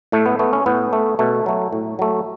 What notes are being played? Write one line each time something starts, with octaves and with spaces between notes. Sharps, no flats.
A2 A3
B3
A3 B3
C#4
A2 B3
A3
B2 A3
F#3 A3
A2
F#3 A3